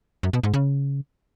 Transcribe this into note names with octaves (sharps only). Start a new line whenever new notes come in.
F#2
B2
G#2
C#3